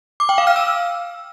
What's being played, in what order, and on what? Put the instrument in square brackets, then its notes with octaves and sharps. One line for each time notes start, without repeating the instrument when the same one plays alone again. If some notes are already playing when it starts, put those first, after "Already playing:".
[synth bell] D6
G5
F5
F6
E6